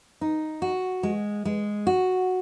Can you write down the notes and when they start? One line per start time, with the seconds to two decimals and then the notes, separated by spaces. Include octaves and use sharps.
0.21 D#4
0.62 F#4
1.03 G#3
1.45 G#3
1.87 F#4